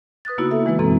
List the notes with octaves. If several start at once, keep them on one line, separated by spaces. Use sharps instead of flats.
B4 D#6 F#6 A6
C#3 A#3 B3 D#4 E4 F#4
A4 E5
E3 G#3 E4 B4
F#2 B2 E3 C4 A4 A#5